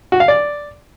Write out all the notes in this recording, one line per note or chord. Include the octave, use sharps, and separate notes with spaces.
F#4
F5
D5